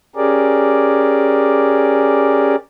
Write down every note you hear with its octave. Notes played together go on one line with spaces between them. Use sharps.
C#4 G4 G#4 A#4 D5